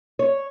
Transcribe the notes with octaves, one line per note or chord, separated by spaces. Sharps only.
C#5